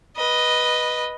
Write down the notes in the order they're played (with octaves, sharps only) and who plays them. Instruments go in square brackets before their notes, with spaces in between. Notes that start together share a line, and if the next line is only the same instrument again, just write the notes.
[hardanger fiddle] B4 D#5